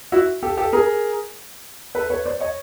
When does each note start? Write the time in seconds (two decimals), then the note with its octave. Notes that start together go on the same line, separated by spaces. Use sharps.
0.12 E4 F#4
0.43 G4 A4
0.57 G4 A4
0.73 G#4 A#4
1.95 A4 B4
2.10 B4 C#5
2.25 C5 D5
2.40 C#5 D#5